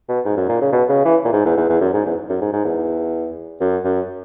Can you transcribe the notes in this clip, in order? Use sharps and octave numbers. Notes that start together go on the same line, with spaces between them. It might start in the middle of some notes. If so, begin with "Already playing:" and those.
B2
G#2
F#2
A#2
C#3
B2
C#3
E3
A#2
G#2
E2
E2
E2
F#2
G#2
E2
F#2
G#2
G#2
E2
F#2
F#2